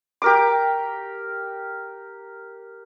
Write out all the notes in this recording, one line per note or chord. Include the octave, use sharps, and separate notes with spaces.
G4 A#4 D6